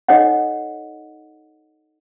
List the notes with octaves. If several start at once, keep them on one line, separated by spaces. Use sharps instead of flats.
D#4 A4 C#5 D#5 F#5